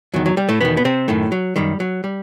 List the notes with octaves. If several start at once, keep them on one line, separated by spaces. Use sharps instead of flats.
E2 D#3 F#3
F#3
G3
A2 A3
E2 B2 D#3 B3
B3
C3 C4
F#2 A2 D#3 A3
F#3
F#2 D#3 G3
F#3
G3